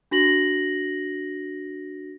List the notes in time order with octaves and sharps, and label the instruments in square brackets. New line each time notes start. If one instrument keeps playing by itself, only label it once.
[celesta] D4 F#4 A#6 F#7